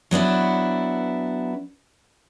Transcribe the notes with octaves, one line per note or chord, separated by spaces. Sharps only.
F#3 B3 D4 E4